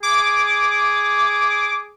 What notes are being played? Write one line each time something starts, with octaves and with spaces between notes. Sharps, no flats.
G#4 D6